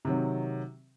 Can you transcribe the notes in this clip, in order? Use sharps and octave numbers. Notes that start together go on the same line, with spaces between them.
C3 D#3 F#3